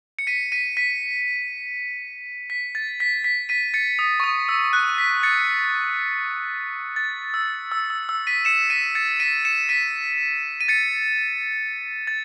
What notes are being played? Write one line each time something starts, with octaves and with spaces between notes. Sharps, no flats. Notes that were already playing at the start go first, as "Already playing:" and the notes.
C#7
B6 D#7
B6 D#7
B6 D#7
B6
A6
B6
B6
B6 D#7
A6 C#7
D#6
C#6
D#6
E6
F#6
B6
A6 C#7
A6
E6
E6
E6
E6
B6 D#7
C#7 E7
B6 D#7
A6 C#7
B6 D#7
C#7 E7
B6 D#7
D#7
A6 C#7
A6